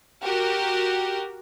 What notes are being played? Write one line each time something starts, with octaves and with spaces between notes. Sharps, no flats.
F#4 G4 A#4